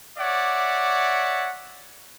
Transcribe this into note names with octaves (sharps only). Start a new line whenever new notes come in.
C#5 D5 E5 F#5 D6